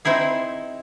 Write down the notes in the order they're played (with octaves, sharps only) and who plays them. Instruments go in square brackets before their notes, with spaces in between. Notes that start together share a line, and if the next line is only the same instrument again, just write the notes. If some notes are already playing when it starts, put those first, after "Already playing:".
[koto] C4 D#4 E4 G#4